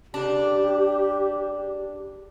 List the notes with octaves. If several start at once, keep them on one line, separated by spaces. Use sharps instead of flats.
C#3 D4 G4